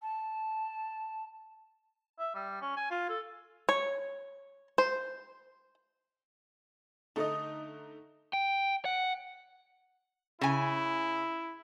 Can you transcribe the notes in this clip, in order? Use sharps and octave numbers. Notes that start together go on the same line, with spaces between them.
A5
E5
G3
C#4
G#5
F4
A4
C#5
C5
D3 A3 D#4 A4 D#5
G5
F#5
C#3 E4 G#5